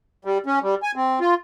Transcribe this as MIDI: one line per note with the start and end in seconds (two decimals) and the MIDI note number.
0.25 0.38 55
0.46 0.59 61
0.62 0.75 55
0.83 0.92 80
0.96 1.19 60
1.21 1.34 65